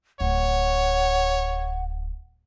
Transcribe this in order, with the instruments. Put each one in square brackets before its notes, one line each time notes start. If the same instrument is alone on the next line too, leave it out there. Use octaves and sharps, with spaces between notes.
[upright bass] D1 [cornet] C#5 [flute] F#5